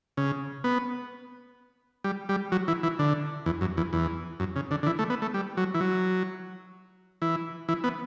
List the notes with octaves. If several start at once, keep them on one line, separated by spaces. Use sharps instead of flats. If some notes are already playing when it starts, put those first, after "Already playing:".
C#3
B3
G3
G3
F#3
E3
E3
D3
E2
F#2
E2
E2
F#2
C#3
D3
D3
E3
A3
B3
A3
G3
F#3
E3
F#3
E3
E3
B3